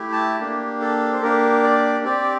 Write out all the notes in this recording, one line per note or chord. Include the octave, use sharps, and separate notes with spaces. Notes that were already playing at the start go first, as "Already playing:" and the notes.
Already playing: A3 E4 G4
A5
A#3 D4 G4
A4
C5
A#3 D4 G4 A#4
D5
C4 G4 D5